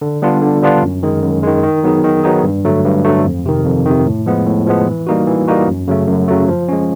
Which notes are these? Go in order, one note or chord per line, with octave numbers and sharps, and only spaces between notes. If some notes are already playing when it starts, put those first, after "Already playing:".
D3
G3 B3 D4 F4
D3
G3 B3 D4 F4
F#2
D#3 G#3
F#2
D#3 G#3
D#3
F#3 B3 D#4 G#4
D#3
F#3 B3 D#4 G#4
G2
D3 F#3 A3
G2
D3 F#3 A3
F2
C3 D#3
F2
C3 D#3
A2
F3 G#3 B3
A2
F3 G#3 B3
E3
G3 A#3 D#4 F#4
E3
G3 A#3 D#4 F#4
F#2
C#3 F#3 A3
F#2
C#3 F#3 A3
F3
G#3 C#4